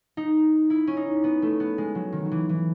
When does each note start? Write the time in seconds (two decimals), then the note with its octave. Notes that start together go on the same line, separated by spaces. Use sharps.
0.17 D#4
0.70 E4
0.87 C#4
0.97 D#4
1.24 B3
1.42 A3
1.60 B3
1.78 G#3
1.95 F#3
2.13 D#3
2.25 F#3
2.32 E3
2.49 E3